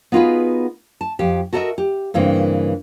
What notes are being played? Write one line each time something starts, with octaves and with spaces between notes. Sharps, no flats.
B3 D#4 F4 F#4 G#4 B4
A5
F2 G4
F#4 A4 A#4 C#5 D#5 E5
G4
G2 C#3 E3 A#3 C4